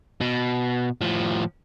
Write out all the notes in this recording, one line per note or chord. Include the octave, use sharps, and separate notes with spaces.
B2
A2 F3